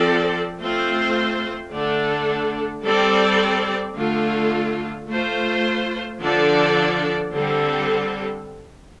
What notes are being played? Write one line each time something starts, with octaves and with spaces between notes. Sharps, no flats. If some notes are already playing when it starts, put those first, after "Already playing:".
Already playing: F3 C4 A4 D5
A3 C4 F4 C5
D3 A3 D4 A4
G3 C4 A4 D5
D3 A3 F4
A3 F4 C5
D3 F3 D4 A4 D5
D3 G3 C4 A4